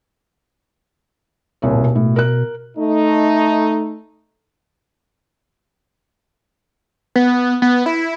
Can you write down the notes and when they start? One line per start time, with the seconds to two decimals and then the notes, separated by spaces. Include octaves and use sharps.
1.62 D#1 C2 C#5
1.75 B2
1.95 A2
2.16 A#4 F#6
2.77 A3 D#4
7.16 B3
7.62 B3
7.86 E4